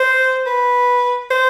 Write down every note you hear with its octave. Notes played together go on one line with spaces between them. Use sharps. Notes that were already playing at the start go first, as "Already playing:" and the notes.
Already playing: C5
B4
C5